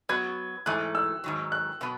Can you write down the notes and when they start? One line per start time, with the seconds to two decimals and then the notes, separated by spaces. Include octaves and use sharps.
0.09 F#3 B3 F#4 G#6
0.66 G#2 E3 A3 F#6
0.95 E6
1.24 G#2 D#3 F#3
1.52 F#6
1.81 B2 F#3 B3